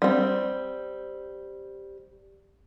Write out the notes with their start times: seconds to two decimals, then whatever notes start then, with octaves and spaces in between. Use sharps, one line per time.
0.02 G3 C4